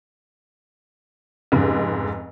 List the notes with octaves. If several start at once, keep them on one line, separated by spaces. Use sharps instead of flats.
F1 G#2 C#3